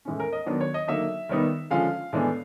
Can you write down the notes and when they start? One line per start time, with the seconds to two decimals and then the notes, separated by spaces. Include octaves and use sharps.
0.05 A2 E3 G#3 C#4
0.20 A#4
0.33 D#5
0.46 D#3 F#3 B3 D4
0.61 C#5
0.74 D#5
0.88 D3 F#3 A#3 D#4 E5
1.29 D#3 G3 B3 D#4
1.70 D3 F3 G#3 C#4 F5
2.13 A2 E3 G#3 B3 D4